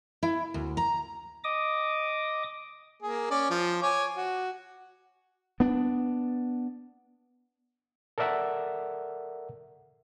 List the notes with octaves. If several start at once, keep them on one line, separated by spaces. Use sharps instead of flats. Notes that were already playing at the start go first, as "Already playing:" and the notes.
E4
D2
A#5
D#5 D6 D#6
A#3 G#4
C#4 D5
F3
C#5 G#5 D6
F#4
B3 D4
A4 A#4 D5 E5 F#5